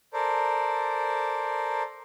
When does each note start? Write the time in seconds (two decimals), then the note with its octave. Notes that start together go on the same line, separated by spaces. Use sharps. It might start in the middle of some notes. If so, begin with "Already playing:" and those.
0.13 A4 A#4 C5 D5